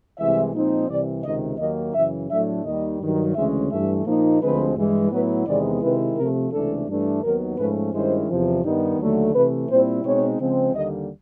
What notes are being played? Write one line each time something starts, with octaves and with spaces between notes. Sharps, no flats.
C2 C3 E3 G#3 E5
A#2 F3 G#3 C4 D#4
C2 C3 E3 D5
C#2 C3 D#3 D#5
D#2 D#3 F#3 A#3 D#5
F#2 C#3 E3 E5
A2 F#3 A3 D4 E5
D#2 D#3 G3 D#5
G2 D#3 F#3
D2 C#3 E3 G#3 C#4 E5
G2 E3 A3 E5
A#2 F3 A#3 D#4
D2 D3 F3 G#3 C4 B4
G2 E3 G#3
A2 F#3 B3 E4 B4
E2 C3 D#3 G#3 B3 D5
C3 D#3 G#3 C4 E4 B4
C3 F3 A3 A#4
C#2 C3 E3 A3 D4 A4
G2 E3 A3 D4
D#2 D#3 F#3 B3 A#4
G#2 F3 A3 C#4 B4
G2 D#3 G#3 C#4 E4 C5
E2 C3 F3
G2 D#3 G3 B3 D#4
D#2 D3 F#3 A3
C3 E3 A3 B4
A#2 G3 C4 E4 C5
B2 G#3 C4 D#4 C#5
C#3 F3 G#3 C4
D#2 D3 G3 A#3 D#5